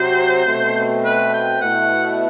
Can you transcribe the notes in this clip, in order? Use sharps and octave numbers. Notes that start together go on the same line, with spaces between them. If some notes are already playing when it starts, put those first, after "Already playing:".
Already playing: C3 F#3 C4 F#4 C5
B2 A3 C4
B4
G5
B2 A3 E4 F#5